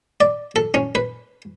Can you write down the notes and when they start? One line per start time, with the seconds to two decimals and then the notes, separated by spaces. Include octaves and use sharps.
0.21 D5
0.56 A4
0.74 C#4
0.95 B4